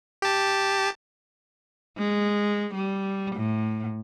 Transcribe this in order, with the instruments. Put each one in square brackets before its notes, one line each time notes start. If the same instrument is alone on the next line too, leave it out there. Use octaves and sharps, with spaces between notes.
[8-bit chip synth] G4 A5
[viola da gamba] G#3
G3
A2